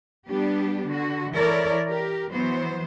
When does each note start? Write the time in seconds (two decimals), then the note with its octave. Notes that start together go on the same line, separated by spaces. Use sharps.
0.28 G3 B3 D4 G4
0.87 D3 F#4
1.33 E3 E4 A4 A#4 C#5 D5
1.87 G4 A#4
2.31 E3 F#3 B3 C5